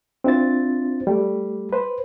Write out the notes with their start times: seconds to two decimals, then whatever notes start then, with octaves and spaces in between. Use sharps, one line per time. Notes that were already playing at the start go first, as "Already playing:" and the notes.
0.24 C4 D4 E4 F4 C5 A6
1.07 G3 A3
1.73 B4 C5